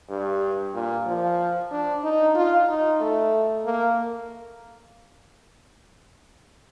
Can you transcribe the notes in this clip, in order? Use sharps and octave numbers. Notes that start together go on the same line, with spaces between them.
G2
A#2
F3
D4
D#4
F4
D#4
A3
A#3